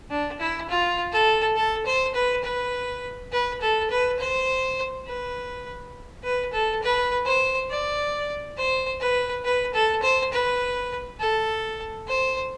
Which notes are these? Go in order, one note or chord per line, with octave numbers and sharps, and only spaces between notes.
D4
E4
F4
A4
A4
C5
B4
B4
B4
A4
B4
C5
B4
B4
A4
B4
C5
D5
C5
B4
B4
A4
C5
B4
A4
C5